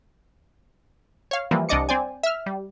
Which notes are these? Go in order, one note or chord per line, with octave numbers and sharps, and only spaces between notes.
C#5 F5
E3 F3 G3 A#3
C2 D4 D5 D#5 D6 C#7
C4 C5 D5 G#5
E5 F6
G3